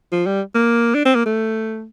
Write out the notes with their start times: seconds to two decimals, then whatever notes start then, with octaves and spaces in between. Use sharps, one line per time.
0.12 F3
0.27 G3
0.55 A#3
0.95 D4
1.05 C4
1.15 A#3
1.26 A3